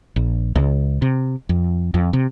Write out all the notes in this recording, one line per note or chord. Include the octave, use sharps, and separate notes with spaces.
A#1
C#2
C3
F2
F2
C3